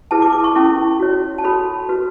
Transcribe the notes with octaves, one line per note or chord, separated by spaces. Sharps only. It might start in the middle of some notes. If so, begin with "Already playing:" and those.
E4 G#4 B4 A5
D6
D6
C#6
C#4 E4 A4
F#4 C#5
A5
F#4 A4 C#5 B5
F#4 B4